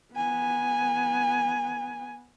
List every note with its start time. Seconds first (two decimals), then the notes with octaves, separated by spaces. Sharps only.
0.13 B3 G#5